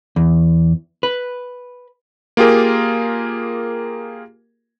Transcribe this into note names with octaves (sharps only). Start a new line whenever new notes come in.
E2
B4
A#3 F4 G4 G#4 A#4